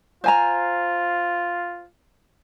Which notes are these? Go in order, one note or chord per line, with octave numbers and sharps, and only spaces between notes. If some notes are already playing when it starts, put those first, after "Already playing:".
F4 C5 G#5 A#5